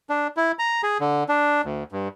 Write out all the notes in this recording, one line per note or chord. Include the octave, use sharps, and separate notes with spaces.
D4
E4
A#5
G#4
D3
D4
D2
G2